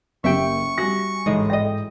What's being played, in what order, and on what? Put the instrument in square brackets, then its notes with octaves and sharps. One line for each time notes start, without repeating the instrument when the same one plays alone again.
[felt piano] F#1 A#3 G4 [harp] E5 G5 [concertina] C#6
[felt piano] G3 G#5 A#6 [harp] F#4
[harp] A1 G#3 D#5 [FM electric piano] G#2
[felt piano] A4 D5 G5 [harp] D#5 A#6